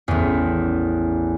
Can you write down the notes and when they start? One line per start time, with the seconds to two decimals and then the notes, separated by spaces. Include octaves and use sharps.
0.08 A1 E2